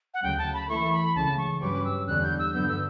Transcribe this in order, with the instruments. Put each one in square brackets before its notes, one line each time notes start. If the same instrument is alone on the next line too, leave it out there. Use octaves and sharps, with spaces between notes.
[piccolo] F#5
[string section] D2 C#3 F#3 [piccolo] G5
[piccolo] A5
B5
[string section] E3 A3 E4 A4 [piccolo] C#6
[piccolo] B5
[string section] C#2 C#3 E3 [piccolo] A5
[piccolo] C#6
[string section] G2 F#3 C#4 G4 B4 [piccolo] D6
[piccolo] E6
[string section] E2 D3 G3 C#4 [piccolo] F#6
[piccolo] G6
E6
[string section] G2 D3 F#3 B3 [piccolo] G6
[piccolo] E6